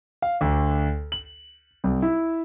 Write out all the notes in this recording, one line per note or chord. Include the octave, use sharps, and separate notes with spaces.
F5
D2
F#7
C2
E4